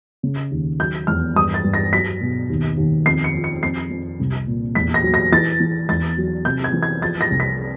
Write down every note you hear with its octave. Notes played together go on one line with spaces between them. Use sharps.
C#3
D#2
F#3 G6
E2 F6
G2 D#6
A6
G2
A#6
F#3 B6
B2
D#2
D#2
F2 C7
C#7
F3
C#7
F2 C7
F2
C2
A#2
E2 B6
A#6
F#3
A#6
E3 A6
E3
E2 A6
F#3
C3 G6
G#6
E3
G#6
F3 A6
A#6
C2
B6